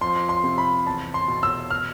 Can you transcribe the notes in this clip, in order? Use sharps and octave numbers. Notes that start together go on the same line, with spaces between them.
F2 C6
C6
C3
B5
E2 A5
C6
B2
E6
F6